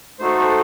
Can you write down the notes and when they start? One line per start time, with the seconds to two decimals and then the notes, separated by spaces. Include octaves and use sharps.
0.19 A3 D#4 F#4 A4 C5
0.37 C5